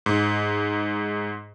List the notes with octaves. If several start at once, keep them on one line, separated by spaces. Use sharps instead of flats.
G#2